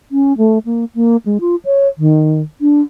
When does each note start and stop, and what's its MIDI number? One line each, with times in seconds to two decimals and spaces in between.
0.11 0.36 61
0.37 0.58 57
0.65 0.85 58
0.95 1.17 58
1.26 1.38 56
1.41 1.55 65
1.65 1.87 73
1.98 2.41 51
2.61 2.81 62